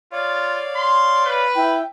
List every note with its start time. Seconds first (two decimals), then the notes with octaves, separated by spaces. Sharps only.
0.12 F4 C#5 D5 F5
0.76 C6
1.25 B4
1.55 E4 G5